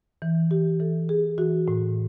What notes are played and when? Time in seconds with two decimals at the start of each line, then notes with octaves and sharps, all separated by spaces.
0.22 E3
0.51 E3 G4
0.80 E3 A4
1.09 E3 G#4
1.38 E3 F#4
1.68 A2